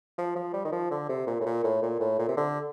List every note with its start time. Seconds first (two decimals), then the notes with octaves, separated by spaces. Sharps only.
0.18 F3
0.36 F3
0.54 G3
0.65 D#3
0.72 F3
0.91 D3
1.09 C3
1.27 A#2
1.41 A2
1.46 A#2
1.64 A2
1.82 A#2
2.00 A2
2.19 A#2
2.28 C3
2.37 D3